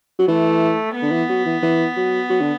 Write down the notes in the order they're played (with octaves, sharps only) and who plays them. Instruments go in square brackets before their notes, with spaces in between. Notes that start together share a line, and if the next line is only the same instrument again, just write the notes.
[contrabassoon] F#3
[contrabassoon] E3 [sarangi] A3
[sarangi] B3
[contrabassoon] D3
E3
F#3
E3
E3
F#3
F#3
D3